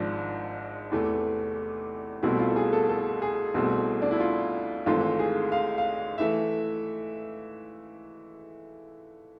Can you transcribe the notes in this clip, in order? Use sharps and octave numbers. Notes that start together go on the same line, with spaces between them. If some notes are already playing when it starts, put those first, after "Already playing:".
Already playing: G#1 G#2 F3 D4
E2 C3 E3 A3
C2 B2 A3 C4 E4
F4
A4
G#4
A4
A4
G#4
C2 B2 A3 C4
D4
E4
F4
G#1 G#2 E3 A3 C4 F4
G#4
F5
F5
E3 A3 E5